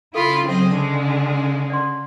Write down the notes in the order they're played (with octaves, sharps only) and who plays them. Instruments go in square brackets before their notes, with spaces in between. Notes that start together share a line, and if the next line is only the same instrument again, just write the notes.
[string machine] C#3 [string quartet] E4 F4 B5 [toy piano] A4 C6
[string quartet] F#3 C4 D#5
D3 G#3
[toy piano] D5 F#5 C6